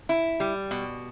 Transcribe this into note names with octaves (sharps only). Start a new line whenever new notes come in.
E4
G3
B2